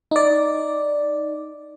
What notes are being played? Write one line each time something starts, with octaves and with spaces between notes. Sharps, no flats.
D#4 D5